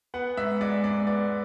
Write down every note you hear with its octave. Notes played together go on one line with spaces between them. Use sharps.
B3 F#5
G#2 E5
G#3 D5
G#2 D5
B3 D5